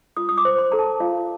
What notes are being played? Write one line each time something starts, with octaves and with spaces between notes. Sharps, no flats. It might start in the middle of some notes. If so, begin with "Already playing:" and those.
F4 D#6
D#6
D6
C5
C6
A4 A#5
A5
F4 F5